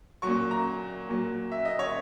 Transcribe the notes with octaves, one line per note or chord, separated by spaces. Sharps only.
A#2 F#3 C#6
A#5
A#2 F#3
E5
D#5
C#5